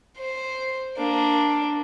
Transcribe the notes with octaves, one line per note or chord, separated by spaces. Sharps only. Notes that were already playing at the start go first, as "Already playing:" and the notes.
C5
A#3 D4